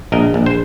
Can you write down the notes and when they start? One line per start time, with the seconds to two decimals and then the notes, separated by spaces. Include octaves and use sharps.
0.12 A#1 A#4 D#5
0.34 A#1
0.46 C5